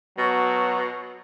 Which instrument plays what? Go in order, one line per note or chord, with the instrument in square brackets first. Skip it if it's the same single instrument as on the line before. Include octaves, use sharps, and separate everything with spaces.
[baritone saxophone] B2 [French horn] F#3